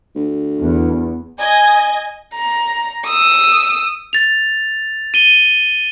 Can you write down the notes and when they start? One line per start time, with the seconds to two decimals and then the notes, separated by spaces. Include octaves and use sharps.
0.15 D2
0.60 E2
1.40 D#5 G#5 G#6
2.35 A#5
3.06 D#6 E6
4.13 A6 F7
5.14 D#7 G7